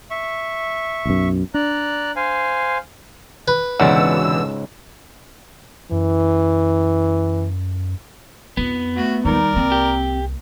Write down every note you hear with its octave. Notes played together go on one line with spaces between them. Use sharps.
E5 C#6
B1 F#2
D4 D5 A#5 F#6
C5 F5 G#5
B4
C#2 G#2 B2 D3 E3 D5 F#5 E6
F#2 E3
F2 B3 D#4
A3 F#4
D#2 G3 D#4 A#4 D5
C2 A#3 C4
G4